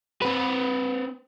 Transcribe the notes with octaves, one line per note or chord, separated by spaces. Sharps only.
C4 B4